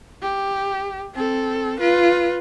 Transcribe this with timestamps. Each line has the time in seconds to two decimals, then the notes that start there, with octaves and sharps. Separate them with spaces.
0.22 G4
1.14 C4 A4
1.80 F4 B4